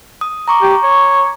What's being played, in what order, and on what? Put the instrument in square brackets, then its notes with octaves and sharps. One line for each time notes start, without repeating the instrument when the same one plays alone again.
[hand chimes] D#6
A#5 C#6 D6
[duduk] G4
C#5